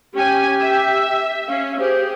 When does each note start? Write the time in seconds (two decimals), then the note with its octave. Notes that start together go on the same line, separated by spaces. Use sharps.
0.14 C#4 G4 G#5
0.60 E5
1.48 C#4 F5
1.79 G4 G#4 C5